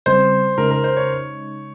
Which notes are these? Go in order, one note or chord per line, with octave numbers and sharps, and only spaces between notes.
C#3 G3 C4 C5
C#3 G#3 D#4 A#4
A#4
C5
C#5